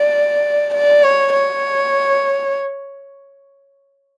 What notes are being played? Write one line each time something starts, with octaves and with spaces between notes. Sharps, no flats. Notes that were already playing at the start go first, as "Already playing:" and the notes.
Already playing: D5
D5
C#5
C#5